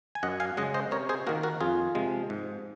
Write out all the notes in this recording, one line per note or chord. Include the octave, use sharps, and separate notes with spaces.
G#5
F#2 D#5 F#5
F5 G#5
C#3 G#3 D#5 F#5
C5 D#5
C3 A#4 C#5
G#4 C5
D#3 A#3 F#4 A#4
F#4 A#4
F2 F4 G#4
C3 F3 G#3
G#2